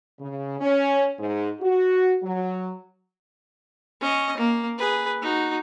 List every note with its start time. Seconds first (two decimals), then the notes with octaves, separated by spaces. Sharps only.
0.19 C#3
0.60 C#4
1.19 G#2
1.61 F#4
2.22 F#3
4.01 C#4 D#5
4.37 A#3
4.78 G#4 B4
5.22 D#4 F#4